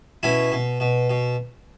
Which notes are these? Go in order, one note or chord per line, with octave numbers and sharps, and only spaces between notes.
B2 C#4 E4
B2
B2
B2